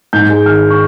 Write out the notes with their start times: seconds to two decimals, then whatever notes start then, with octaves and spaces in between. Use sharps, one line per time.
0.13 G#2 G6
0.29 G#3
0.46 D#3 F6
0.70 C#6